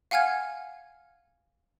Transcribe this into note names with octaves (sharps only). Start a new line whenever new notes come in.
F5 F#5 G#5 F6 G#6